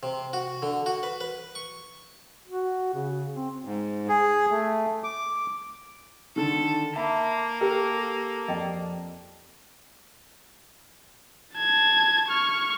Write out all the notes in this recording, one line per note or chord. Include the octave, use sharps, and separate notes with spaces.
C3
F#4
D3
F#4
B4
B4
C#6
F#4
C#3
C4
G#2
G#4
A3
D6
D3 D#3 A4
A#3 E5 A5 B5
G4 A4 A#4 G5
F2 D5 D#5 G5 A5
A5 G#6
C#6 F6